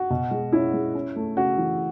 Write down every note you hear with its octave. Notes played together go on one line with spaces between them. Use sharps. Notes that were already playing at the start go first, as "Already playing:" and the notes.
Already playing: F#4
B2
G#3
C#4 E4
G#3
C#4
A3
C#3 F#4
E3